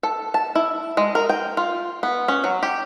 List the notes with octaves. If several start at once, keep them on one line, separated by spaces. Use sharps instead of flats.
A4
A5
E4
G#3
A#4
G5
F4
B3
C#4
F#3
G4